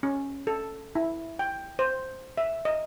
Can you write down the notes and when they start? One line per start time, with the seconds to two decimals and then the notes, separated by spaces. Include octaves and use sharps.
0.03 C#4
0.47 A4
0.95 E4
1.39 G5
1.79 C5
2.38 E5
2.65 D#5